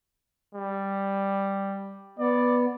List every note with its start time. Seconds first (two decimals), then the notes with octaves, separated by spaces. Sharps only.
0.55 G3
2.19 B3 D5